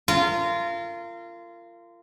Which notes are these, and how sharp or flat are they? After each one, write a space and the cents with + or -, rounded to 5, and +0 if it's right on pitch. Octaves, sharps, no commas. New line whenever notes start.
F4 -25 A#4 -30